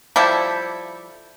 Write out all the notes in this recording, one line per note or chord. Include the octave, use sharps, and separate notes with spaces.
F3 G3 E4 A4